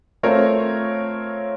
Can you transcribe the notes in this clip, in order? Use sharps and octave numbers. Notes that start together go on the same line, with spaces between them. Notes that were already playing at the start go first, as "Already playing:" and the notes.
A3 C4 F4 A#4 C#5